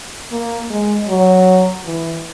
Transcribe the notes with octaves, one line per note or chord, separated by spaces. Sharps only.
A#3
G#3
F#3
E3